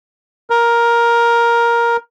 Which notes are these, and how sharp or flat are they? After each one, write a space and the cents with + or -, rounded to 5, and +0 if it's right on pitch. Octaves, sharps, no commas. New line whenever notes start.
A#4 +10